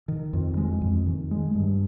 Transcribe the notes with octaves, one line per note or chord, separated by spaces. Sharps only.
D#3
F2
G#3
F2
D#3
G#3
G2